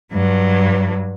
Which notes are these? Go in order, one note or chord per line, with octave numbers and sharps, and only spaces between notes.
G2 F#3